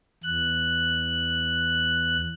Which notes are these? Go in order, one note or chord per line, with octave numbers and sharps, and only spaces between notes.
E2 F#6